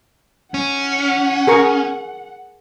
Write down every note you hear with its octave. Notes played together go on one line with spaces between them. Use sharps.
C#4 F#5
G#4 A#4 C#6